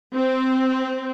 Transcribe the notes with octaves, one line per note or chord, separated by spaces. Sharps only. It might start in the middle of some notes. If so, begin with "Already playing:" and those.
C4